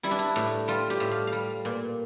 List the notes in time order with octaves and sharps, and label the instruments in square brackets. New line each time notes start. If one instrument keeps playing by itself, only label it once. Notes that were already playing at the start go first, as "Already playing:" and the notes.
[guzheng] G3 E4
D4
E4
A2
G3 F4
G4
A2
F5
F5
G3
A#2